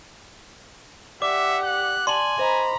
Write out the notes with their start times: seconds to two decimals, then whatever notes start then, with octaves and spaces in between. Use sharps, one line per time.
1.22 G4 D5 E5 F#5 D6
1.64 F#6
2.07 D5 G#5 A5 C6 F#7
2.39 C5 D#5 A#5 B5